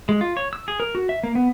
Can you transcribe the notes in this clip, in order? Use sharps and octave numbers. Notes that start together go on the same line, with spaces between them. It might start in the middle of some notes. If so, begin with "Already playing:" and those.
G#3
F4
C#5
E6
G#4
A#4
F#4
E5
A#3
B3